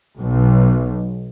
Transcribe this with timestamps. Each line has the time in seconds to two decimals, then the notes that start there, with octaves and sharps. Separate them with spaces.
0.18 B1